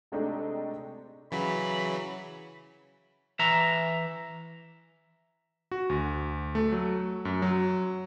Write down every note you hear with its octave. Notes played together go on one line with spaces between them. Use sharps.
C3 G#3 A3 C4 D4 D#4
C#3 E3 F#3 B5
E3 E5 A#5
F#4
D2
A3
F#3
F#2
F#3